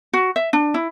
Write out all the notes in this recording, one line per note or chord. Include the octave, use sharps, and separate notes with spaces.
F#4
E5
D4
E4